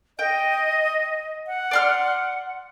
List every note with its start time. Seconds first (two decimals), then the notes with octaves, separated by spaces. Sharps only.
0.19 D#5 G5
1.47 F#5
1.71 D5 C6 F6